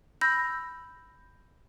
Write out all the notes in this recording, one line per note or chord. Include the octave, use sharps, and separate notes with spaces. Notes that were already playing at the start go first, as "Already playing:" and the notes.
B5 E6 G6 A#6